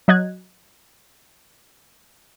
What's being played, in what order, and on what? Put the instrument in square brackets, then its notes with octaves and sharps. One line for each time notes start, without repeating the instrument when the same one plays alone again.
[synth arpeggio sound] F#3 D#5 F#6 G#6